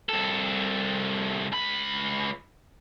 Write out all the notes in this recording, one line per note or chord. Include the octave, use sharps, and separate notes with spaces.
C2 A4
C#2 B5